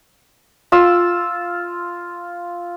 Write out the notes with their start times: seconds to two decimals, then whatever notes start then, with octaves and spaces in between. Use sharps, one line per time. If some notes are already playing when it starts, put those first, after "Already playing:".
0.72 F4 E6